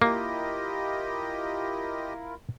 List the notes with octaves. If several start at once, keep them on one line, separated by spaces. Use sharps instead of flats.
A#3 E4 F4 G4 A#4 D#5